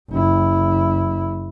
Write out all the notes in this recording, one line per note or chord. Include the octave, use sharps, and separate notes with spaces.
F#1 E4